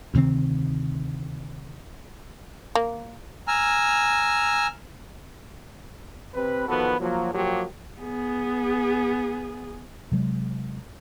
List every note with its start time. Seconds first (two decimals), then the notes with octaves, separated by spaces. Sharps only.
0.14 D2 C3 D#3 C4
2.75 A#3
3.48 G#5 A#5 E6 F6
6.35 C3 B4
6.68 D#3 F3 B3 F#4 A4 B4
6.99 F3 F#3 A#3
7.33 F3 F#3 A#3 G4
8.00 B3 G#4
10.12 C3 F#3 G#3